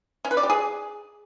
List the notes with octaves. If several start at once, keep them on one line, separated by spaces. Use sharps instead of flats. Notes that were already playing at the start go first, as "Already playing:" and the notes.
C#4
B4
D5
G4
G#4